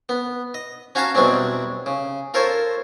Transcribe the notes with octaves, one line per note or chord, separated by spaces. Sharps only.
B3
D#5
C#4 F#4 C#5 F5 A5 A#5
E2 B2 F#3 G3 C4 D4
C#3
F4 A4 A#4 C5 C#5